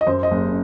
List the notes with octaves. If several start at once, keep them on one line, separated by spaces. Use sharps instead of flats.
D#5
F#2 C5
D#5
F#1